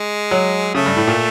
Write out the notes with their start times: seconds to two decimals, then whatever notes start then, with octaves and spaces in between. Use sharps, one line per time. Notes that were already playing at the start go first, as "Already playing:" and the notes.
Already playing: G#3
0.31 F#3
0.75 C#3 A3
0.86 G2
0.96 A2
1.07 A#2